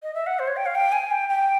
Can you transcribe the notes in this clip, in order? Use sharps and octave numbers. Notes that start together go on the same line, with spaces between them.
D#5
E5
F#5
C5
C#5
G5
F5
G5
G#5
G5
G5